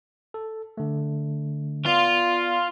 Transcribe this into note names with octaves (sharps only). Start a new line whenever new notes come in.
A4
D3 A3
B3 F4 D5 F5